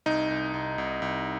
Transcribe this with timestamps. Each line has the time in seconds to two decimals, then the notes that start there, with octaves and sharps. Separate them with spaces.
0.06 C2 D#4
0.30 C2
0.54 C2
0.78 C2
1.02 C2